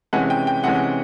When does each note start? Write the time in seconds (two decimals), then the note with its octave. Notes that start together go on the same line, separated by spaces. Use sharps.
0.13 C3 E3 G#3 C#4 F#5
0.30 G5
0.47 G5
0.64 C3 E3 G#3 C#4 F#5